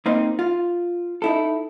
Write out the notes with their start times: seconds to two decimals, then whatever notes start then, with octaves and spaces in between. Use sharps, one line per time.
0.06 A#3 C4 D#4
0.39 F4
1.22 D#4 E4 A4